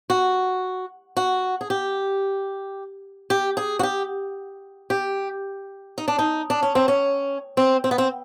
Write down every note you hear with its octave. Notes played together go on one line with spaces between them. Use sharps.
F#4
F#4
G#4
G4
G4
G#4
F#4
G4
G4
D#4
D4
D#4
D4
C#4
C4
C#4
C4
C4
B3
C4